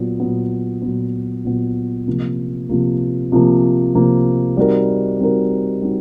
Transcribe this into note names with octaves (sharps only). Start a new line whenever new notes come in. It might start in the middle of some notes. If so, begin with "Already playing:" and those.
Already playing: A#2 F#3 B3
A#2 F#3 B3
A#2 F#3 B3
A#2 F#3 B3
C3 F3 A#3
C3 F3 A#3
C3 F3 A#3
C3 F3 A#3
G3 C4 D#4 F#4 A#4
G3 C4 D#4 F#4 A#4
G3 C4 D#4 F#4